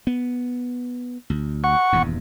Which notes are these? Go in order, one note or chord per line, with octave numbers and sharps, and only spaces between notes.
B3
D2
F#5 C#6
D#1 E2 G2